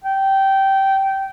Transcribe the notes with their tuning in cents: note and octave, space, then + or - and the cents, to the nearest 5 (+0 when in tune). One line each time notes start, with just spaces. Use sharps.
G5 -15